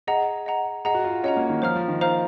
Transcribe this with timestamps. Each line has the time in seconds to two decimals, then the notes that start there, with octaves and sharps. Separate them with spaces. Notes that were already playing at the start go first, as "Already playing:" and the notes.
0.07 G#4 D#5 F#5 A#5
0.46 D#5 F#5 A#5
0.85 G#4 D#5 F#5 A#5
0.94 F#4
1.04 F4
1.24 C#4 D#5 F#5 A#5
1.37 A#3
1.50 D#3
1.62 F3 C5 F5 A#5 F6
1.75 F3
1.88 D#3
2.01 C5 F5 A#5 F6